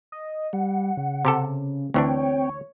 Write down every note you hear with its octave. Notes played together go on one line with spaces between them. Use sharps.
D#5
G3 F#5
C#3
C3 G4 A4
D2 E3 C4 D4 C#5 G5